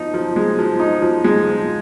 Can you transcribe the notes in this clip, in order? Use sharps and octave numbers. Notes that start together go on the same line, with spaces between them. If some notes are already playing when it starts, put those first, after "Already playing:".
Already playing: F3 D#4
F3
G#3
F3
D#4
F3
G#3
F3